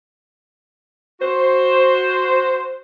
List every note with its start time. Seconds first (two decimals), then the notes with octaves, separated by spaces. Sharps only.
1.20 F#4 C5